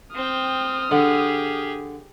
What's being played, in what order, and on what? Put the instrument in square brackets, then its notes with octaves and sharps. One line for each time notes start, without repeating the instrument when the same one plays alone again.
[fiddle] C4 G5 [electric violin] D#6 F6
[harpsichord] D3 [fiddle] G4 G#4